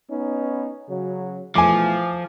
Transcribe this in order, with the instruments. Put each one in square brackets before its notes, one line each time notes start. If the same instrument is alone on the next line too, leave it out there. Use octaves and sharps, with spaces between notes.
[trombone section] B3 C#4 D#4
C#3 F#3
[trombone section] B2 E3 A3 [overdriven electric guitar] F3 [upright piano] G#5 D6